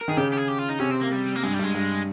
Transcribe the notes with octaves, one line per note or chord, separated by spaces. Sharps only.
A#4
D#3 G#4
C#3 G4
G4
G#4
G4
F4
D#4
C3 C#4
C4
A#3
G3
A#3
G2 G#3
G3
G2 G#3
G2